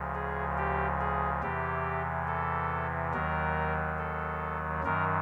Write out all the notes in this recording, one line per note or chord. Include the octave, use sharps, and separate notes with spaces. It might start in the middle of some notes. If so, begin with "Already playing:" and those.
Already playing: D2 C#3 F3
G#4
G4
G#4
E2 C3 E3 G4
A4
D#2 D#3 F#3 A#4
A4
F#2 D#3 F#3 A#4